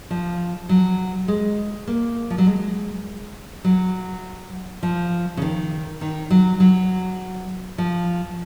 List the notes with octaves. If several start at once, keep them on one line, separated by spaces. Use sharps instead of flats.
F3
F#3
G#3
A#3
F3
F#3
G#3
F#3
F3
C#3
D#3
D#3
F#3
F#3
F3